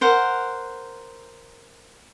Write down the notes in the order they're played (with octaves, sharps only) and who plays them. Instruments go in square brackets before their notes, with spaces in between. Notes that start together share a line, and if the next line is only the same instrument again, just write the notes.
[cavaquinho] A#4 C5 F#5